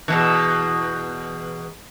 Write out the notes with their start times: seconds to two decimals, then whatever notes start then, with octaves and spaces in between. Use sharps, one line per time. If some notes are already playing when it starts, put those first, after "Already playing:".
0.08 E2 B2 D#3